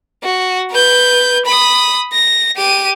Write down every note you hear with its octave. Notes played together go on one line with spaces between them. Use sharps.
F#4
B4 G6
B5 D#6
A#6
G4 D#7